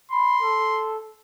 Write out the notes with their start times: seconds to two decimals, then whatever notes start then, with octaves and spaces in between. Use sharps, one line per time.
0.12 B5 C6
0.42 A4